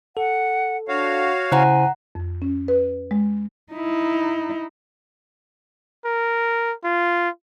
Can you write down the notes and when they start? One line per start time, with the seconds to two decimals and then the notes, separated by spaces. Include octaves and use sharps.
0.17 A4 F#5
0.88 D4 F#4 C#5 F5
1.52 C#3 E4 C5 F#5 G#5 A#5 F#6
2.15 F2
2.42 C#4
2.68 B4
3.11 G#3
3.73 D#4 E4
6.05 A#4
6.84 F4